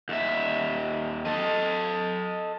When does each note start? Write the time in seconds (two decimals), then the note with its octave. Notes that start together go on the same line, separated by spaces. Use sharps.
0.09 D#2 E5
1.25 A4 D#5